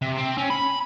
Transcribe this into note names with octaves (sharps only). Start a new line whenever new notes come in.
C3
C4
C#4
B5